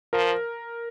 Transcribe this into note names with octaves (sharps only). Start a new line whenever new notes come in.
F3 A#4